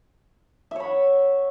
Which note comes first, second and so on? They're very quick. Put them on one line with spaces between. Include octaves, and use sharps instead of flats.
E5 C#5 B5 F#5